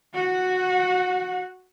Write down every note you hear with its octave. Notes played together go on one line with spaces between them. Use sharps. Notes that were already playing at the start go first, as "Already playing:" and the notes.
F#4 F#5